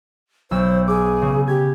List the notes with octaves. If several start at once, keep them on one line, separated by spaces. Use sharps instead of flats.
B1 C5 E6
G#4 D6
C#3
G4 G#6